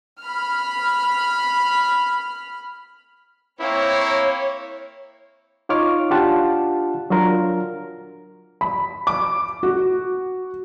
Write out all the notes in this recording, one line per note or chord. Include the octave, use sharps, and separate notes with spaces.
B5 F6
A#3 C4 E4 C#5
D#4 F4 C#5 D6 F6
D4 F4 G4 F#5 A5
F#3 D4 F4 A#4
B5
D6
F#4